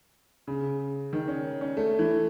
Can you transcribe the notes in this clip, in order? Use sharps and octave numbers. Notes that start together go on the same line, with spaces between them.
C#3
D#3
C#4
C#4
A3
E3